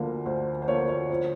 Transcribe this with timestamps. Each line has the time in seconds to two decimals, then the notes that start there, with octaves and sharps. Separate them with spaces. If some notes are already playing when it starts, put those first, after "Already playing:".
Already playing: D2 D3 F3 A#3
0.26 D2 C5
0.62 C5
0.68 D3 F3 A#3 C#5
0.88 C#5
1.10 F2 C5